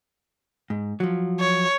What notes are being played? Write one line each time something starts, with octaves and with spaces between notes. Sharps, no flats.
G#2
F3 F#3
C#5